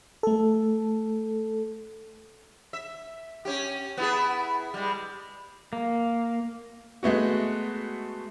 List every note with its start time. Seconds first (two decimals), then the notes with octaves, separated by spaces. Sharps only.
0.23 A3 A4
2.73 E5
3.45 C#4 G4
3.97 B3 E4 G#4
4.74 G3 G#3
5.73 A#3
7.03 G#3 A3 B3 F#4